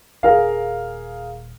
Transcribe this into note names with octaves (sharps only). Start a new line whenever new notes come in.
D#1 G#4 A#4 F5